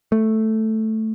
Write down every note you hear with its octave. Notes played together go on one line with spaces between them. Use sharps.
A3